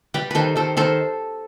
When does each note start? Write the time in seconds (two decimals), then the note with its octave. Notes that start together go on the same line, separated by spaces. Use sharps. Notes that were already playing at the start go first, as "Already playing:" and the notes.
0.14 G3 G4 B4
0.31 D#3 A4 B4 C5
0.56 D#3 A4 C5
0.77 D#3 A4 C5